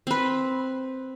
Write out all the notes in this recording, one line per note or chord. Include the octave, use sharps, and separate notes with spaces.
C4 B4